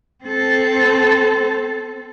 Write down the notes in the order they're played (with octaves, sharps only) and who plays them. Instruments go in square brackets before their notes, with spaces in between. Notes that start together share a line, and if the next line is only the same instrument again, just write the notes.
[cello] C4 A4